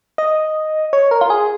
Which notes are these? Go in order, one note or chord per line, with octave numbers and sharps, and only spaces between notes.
D#5
C#5
A#4
F4
G#4